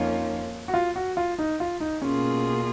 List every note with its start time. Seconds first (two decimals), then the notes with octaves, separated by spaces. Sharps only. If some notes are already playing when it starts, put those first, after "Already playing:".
Already playing: F2 F3 A#3 C#4 D#4 F4
0.68 F#4
0.74 F4
0.96 F#4
1.17 F4
1.39 D#4
1.60 F4
1.80 D#4
2.02 B2 A#3 C#4 F4 G#4